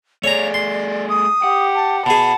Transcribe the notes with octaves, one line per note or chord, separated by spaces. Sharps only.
A3 G#4 C#5 D5 A#5
C6
D#6
G4 F#5
A5
B2 G#4 F#5 A5 B5